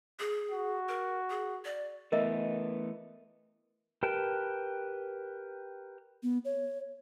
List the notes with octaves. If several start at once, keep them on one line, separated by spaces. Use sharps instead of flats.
G#4
F#4
A#4
G#4
D5
E3 A3 B3 A#4 D#5 E5
G4 A#4 B4 G5 A5
B3
C#5